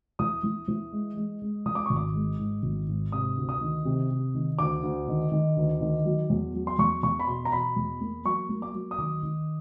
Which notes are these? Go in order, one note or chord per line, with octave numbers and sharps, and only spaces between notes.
E3 D#6
E3
E3
G#3
G#3
G#3
E3 D#6
D6
G#1 C#6
D6
G#3
G#2
G#1
G#2
C3 D#6
D2
D#6
D#3
C3
C3
D#3
D2 D6
D2
D#3
D#3
D2
D#3
F#3
E2
F#3
C6
E2 C#6
E2 C#6
B5
B2 C6
A#5
B2 B5
E2
A#3
F#3 C#6
A#3
D6
F#3
D#6
D#3 D6
D#3